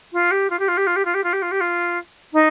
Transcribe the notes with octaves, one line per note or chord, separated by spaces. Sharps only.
F4
G4
F4
G4
F4
G4
F4
G4
F4
G4
F4
G4
F4
G4
F4
D#4